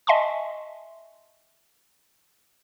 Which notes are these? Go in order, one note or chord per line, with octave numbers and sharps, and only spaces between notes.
D#5 E5 G#5 A5 C6 C#6